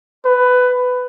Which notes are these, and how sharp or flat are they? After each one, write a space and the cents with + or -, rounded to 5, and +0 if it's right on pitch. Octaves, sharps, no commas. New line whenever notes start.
B4 +15